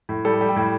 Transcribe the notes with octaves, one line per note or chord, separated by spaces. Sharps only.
A2
G3 A4
G3
G5
A2